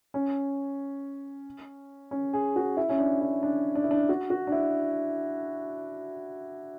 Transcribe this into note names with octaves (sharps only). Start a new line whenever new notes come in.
C#4
C#4
G#4
F#4
E4
C#4
D4
E4
D4
D4
E4
D4
F#4
F#4
D4
E4